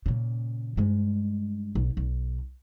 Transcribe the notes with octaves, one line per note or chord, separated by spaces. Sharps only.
A#2 C#3
G2 G#3
B1
B1